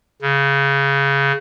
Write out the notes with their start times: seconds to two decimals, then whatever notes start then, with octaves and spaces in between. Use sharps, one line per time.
0.22 C#3